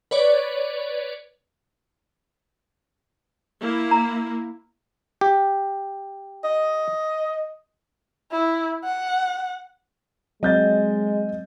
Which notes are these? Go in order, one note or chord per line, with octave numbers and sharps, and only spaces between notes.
B4 C#5 D5
A#3 E4
A#5
G4
D#5
E4
F#5
F#3 G#3 C4 D#5 G6 A6